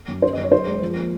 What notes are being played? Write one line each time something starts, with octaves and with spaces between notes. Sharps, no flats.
F#2
C#4 C5
D#5
F#2
C#5
F#2 C5
G#3
F3
A#3